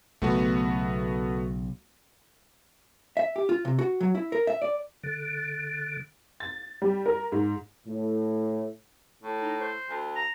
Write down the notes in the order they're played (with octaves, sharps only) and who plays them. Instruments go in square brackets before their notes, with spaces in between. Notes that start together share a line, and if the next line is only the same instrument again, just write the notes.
[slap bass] B1 C#3 [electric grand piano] A3 B3 F#4
[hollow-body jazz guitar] E5
G4
F4
C3
F#4
F#3
E4
A#4
E5
D5
[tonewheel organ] D3
[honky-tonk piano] A6
G3
A#4
G#2
[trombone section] A2
[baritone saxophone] A2
[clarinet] D#4
C5
[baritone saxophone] D2
[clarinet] A#5